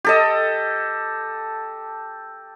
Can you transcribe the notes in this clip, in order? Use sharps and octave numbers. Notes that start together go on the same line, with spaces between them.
G4 A4 D#5